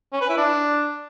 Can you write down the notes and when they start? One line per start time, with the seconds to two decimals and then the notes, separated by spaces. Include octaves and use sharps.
0.13 C#4
0.21 B4
0.29 E4
0.37 D4